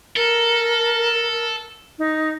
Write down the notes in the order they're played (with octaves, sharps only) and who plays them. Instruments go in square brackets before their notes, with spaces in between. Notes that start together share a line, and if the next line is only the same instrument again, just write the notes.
[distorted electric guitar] A4 [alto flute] A#4
[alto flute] D#4